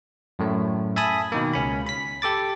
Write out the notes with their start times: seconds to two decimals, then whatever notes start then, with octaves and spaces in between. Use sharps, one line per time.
0.39 F#2 A2 A3
0.96 E5 G#5 A5 B5 D#6
1.32 B2 D#3 A#3
1.53 C#2 C#4 B5
1.86 B5 B6
2.22 G4 A4 D6 A6